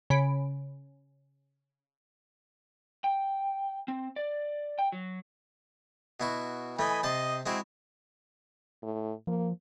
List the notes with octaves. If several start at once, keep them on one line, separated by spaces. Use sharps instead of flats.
C#3 B5 D7
G5
C4
D5
G5
F#3
B2 E4 F#4
E3 A3 D#5 G#5 B5
C3 C5 D#5 A5
G#3 C4 E4 F#4
A2
F3 A#3